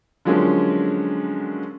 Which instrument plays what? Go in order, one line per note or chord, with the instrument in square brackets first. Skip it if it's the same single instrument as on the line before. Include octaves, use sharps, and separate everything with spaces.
[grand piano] D3 F3 F#3 G#3 A#3 C#4